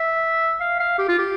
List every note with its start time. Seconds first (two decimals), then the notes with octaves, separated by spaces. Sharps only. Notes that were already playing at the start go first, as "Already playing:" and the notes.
Already playing: E5
0.60 F5
0.80 F5
0.98 G4
1.08 F4
1.18 G4